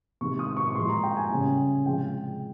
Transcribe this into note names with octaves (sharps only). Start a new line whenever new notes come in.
C3 D#3 G#3 C#6
D#6
C#6
C#6
A#2 F3 G#3 C6
A#5
G5
G#5
C#3 G3
C3 F3 G#3 G5